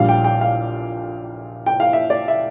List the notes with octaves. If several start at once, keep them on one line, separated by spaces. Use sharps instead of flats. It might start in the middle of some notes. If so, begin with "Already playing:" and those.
Already playing: A#1 A#2 G3 F5
G5
G5
F5
G5
F5
E5
D5
E5